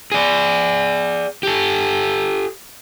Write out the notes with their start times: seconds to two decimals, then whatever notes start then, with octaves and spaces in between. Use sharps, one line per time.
0.12 G#4 D5
1.43 G4 A4